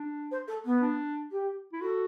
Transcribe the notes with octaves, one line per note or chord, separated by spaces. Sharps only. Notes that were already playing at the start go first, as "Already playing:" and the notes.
Already playing: D4
C5
A4
B3
D4
G4
E4
F#4 A4